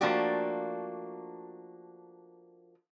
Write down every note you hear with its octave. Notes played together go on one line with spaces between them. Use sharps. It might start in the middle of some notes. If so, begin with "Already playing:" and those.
F3 A3 A#3 D4 F#4 G4